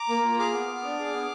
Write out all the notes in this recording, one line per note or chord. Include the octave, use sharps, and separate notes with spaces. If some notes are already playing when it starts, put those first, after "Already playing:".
Already playing: A#5 D6
A#3
F4
G#4 D6 F6
B3
B3
D4
G#4
B3